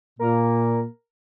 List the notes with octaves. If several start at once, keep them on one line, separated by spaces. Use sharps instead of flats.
A#2 A#3 A#4